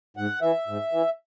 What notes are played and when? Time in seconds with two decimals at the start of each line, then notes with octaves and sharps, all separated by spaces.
0.17 G#2 F#5
0.42 E3 E5
0.68 G#2
0.92 E3